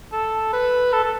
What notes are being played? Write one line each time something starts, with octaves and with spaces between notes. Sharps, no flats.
A4
B4
A4
A4